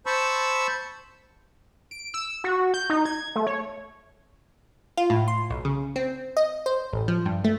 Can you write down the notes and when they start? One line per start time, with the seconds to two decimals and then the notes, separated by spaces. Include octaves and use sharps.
0.06 C5 A5 B5 C#6 E6
1.91 D7
2.14 E6
2.44 F#4
2.74 G6
2.90 D#4
3.05 G#6
3.36 A3
3.47 C#5
4.97 F4
5.10 A2
5.28 C6
5.50 B1
5.65 C#3
5.96 C4
6.37 D#5
6.66 C5
6.93 A1
7.08 F3
7.26 G2
7.44 A3